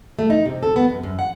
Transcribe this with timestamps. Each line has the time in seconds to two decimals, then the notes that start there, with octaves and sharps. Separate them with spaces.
0.19 A3
0.30 D#4
0.46 C3
0.63 A4
0.76 B3
0.89 F#2
1.03 F#2
1.19 F#5